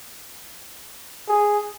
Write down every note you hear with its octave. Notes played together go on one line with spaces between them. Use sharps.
G#4